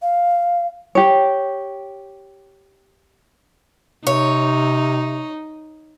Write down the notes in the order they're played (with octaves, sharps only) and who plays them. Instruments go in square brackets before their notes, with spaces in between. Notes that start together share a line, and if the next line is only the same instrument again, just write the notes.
[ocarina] F5
[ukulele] G4 C#5
[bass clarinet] C3 [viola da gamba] D#4 [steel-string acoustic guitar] C#5